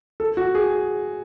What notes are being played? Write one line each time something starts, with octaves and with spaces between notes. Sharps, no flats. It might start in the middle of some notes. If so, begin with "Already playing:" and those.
A4
F#4
G#4